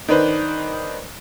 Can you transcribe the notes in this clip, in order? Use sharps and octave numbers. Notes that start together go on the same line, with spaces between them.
D#3 D4 B4 C5